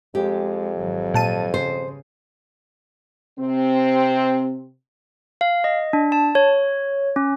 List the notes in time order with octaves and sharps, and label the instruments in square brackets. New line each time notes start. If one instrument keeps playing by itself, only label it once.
[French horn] F2 [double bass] G#3 [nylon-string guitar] G4
[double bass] G#1 F#3
[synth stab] A#2 A5 D#7
[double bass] C#3 [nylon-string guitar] C5
[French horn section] C3 C4
[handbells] F5
D#5
D4
A5
C#5
C#4